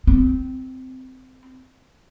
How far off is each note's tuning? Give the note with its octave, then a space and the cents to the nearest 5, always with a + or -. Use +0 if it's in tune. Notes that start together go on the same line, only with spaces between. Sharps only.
C4 -15